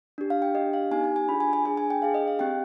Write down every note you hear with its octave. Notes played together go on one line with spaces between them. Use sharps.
D4 G4
F5
G5
D4 G4 D#5
F5
B3 D#4 G4 G#5
G#5
G#5
D4 F4 G#4 B5
G#5
G#5
D4 G#4 G#5
G#5
G5
D4 G#4 F5
D#5
F5
C4 G4 G5